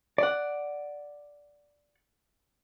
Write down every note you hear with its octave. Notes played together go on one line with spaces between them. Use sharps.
D5 F#5